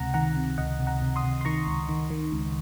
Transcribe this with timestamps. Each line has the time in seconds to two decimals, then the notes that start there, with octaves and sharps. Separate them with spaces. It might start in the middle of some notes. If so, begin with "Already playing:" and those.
Already playing: C#2 C3 F#5 A#5
0.14 D#3 F#5 A#5
0.36 C3
0.58 C#2 D#5 F#5
0.79 C3
0.87 F#5 A#5
1.02 C3
1.16 C6 D#6
1.24 C3
1.41 C6
1.45 D#3 A#5 C#6
1.67 C#2
1.89 D#3
2.10 D#3
2.32 C#2